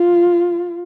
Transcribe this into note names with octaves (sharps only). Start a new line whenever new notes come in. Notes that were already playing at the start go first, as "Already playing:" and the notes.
Already playing: F4